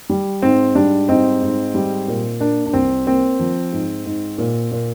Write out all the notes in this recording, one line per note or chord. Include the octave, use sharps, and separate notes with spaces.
G3
G#2 C4
G3 D4
G#2 C4 D#4
G#2
G3
A#2
A#3 D4
D4
C2 C4
A#3 C4
F3
G#2
G#2
A#2
A#2